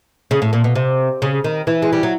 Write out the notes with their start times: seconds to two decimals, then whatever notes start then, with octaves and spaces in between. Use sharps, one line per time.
0.31 C#3
0.42 A2
0.53 A#2
0.64 B2
0.75 C3
1.22 C#3
1.44 D#3
1.67 E3
1.82 G#3
1.93 G3
2.03 F#3